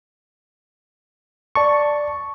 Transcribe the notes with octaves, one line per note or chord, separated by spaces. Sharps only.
D5 A5 C#6